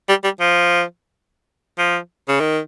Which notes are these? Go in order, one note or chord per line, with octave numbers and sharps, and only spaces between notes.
G3
G3
F3
F3
C#3
D#3